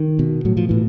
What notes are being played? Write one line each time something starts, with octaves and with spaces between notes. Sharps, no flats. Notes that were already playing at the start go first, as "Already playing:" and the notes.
Already playing: D#3
B2
A2 F#3
F3
A2 E3